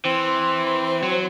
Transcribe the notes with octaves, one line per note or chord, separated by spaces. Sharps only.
E3 C4 C6
F#3